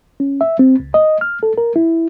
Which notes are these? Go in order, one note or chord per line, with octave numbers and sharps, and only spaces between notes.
C#4
E5
C4
C#2
D#5
F6
A4
A#4
E4